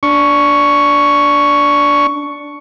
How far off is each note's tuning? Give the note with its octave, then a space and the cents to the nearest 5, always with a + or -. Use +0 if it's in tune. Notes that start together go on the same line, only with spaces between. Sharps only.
D4 -10 C#6 +5